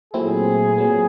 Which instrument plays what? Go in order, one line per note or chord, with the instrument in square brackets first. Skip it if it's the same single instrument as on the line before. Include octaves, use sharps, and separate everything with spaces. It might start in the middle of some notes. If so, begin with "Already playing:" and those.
[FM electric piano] A#2 F#3 A3 C4 E4 [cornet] G#4
[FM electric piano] A#2 F#3 B3